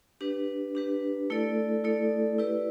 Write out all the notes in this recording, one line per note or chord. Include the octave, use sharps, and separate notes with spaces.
D4 G4 B4
D4 G4 B4
A3 E4 A4 D5
A3 E4 A4 D5
E4 G4 B4 D5